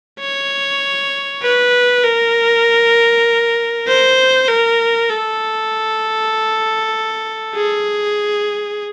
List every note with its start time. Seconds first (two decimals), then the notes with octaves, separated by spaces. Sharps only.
0.20 C#5
1.42 B4
2.04 A#4
3.87 C5
4.48 A#4
5.10 A4
7.55 G#4